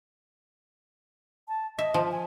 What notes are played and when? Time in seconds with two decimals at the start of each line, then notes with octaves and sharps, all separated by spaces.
1.48 A5
1.79 D#5 E5
1.94 F3
2.11 G#5